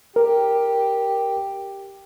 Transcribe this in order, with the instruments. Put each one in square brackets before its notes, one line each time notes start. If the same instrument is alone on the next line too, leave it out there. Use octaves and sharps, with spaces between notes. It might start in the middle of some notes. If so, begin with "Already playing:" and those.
[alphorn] G4 [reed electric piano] A#4